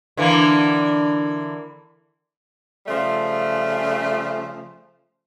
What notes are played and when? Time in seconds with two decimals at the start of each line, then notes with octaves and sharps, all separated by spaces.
0.17 D3 E3 A#3
2.87 C#3 F3 G3 A3